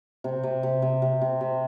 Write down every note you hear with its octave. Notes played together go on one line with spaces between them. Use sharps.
C3
C3
C3
C3
C3
C3
C3